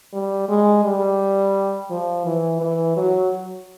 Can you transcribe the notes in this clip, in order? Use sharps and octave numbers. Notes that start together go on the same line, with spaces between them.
G3
G#3
G3
F3
E3
E3
F#3